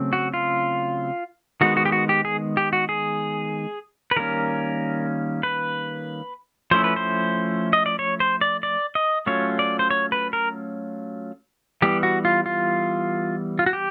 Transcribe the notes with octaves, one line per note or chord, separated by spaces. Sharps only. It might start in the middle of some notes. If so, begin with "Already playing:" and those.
Already playing: C#3 F#3 A3 C4
F#4
F4
D#3 G#3 B3 F#4
F#4
G4
F#4
G4
G#4
G4
F#4
G#4
B4
D#3 G3 A#3 C#4 A#4
B4
F3 A3 C#4 E4 C5
B4
C5
D#5
D5
C#5
C5
D5
D5
D#5
F#3 A3 C#4 F4 C#5
D5
C5
C#5
B4
A#4
E3 G3 B3 G4
F#4
F4
F4
F4
F#4
G4